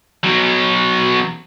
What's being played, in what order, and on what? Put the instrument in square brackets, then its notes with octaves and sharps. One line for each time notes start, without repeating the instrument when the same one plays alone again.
[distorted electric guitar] B2 F#3